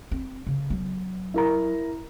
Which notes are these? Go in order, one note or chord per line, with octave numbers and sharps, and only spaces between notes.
C4
C#3
F#3 B3
E4 A#4 A#5